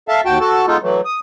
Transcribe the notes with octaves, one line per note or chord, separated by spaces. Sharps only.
A4 E5 F5 A5
D#2 F#4 G5 A5
F#4 A4 A5
G#3 B3 D#4 F4 A4
E3 F#3 A3
D#6